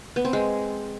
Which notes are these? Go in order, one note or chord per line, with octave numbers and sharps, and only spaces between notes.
B3
C4
G#3